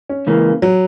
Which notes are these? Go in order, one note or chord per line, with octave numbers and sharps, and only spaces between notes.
C#4
C#2 C#3 E3 A#3
F#3